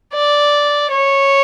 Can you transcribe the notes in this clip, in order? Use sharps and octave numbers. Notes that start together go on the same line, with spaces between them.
D5
C#5